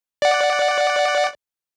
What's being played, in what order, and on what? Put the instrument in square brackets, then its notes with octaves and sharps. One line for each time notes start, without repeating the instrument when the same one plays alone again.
[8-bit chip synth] D5 F#5